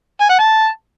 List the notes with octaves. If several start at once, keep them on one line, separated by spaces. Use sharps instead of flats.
G#5
F#5
A5